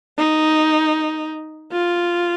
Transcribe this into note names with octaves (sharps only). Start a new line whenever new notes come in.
D#4
F4